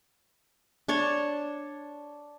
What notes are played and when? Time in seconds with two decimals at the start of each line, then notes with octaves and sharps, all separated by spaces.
0.88 D4 C#5 A5